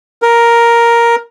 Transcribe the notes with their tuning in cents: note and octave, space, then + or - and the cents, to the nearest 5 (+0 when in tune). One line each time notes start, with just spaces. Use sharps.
A#4 +5